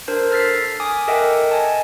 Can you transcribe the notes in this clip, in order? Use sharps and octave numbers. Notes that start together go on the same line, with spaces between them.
D4 A#4 C5
A4 F6 A6 B6 C7
G#5 D6 D#6
A4 A#4 D#5 E5 F#5 G5
D#5 G#5 A5